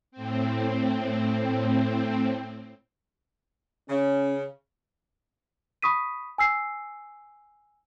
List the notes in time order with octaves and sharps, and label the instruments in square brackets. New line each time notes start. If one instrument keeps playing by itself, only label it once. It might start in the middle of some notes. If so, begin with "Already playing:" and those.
[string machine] A2 C4
[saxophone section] C#3 [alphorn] C#4
[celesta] B5 C#6 D#6 B6 D#7
G#5 E6 C7